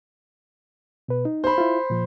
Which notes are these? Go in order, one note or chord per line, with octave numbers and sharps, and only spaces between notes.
B2 B4
D#4
C5 B5
E4 F4
A#2 F3